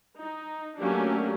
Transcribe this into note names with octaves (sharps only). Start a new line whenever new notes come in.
D#4
F#3 A3 A#3 C#4 D4 G4